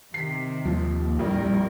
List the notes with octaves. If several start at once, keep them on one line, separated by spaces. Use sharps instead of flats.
C3 D#3 B6 C7
D#2 F3
A#1 F2 A2 G3 A#4